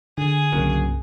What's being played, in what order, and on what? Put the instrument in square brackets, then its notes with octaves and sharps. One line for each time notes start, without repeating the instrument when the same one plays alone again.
[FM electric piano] D3 [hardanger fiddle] G#4
[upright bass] G1 C2 [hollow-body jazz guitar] C#3 F#3 A#3